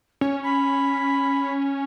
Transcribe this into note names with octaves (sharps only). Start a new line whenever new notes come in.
C#4 C#5
B5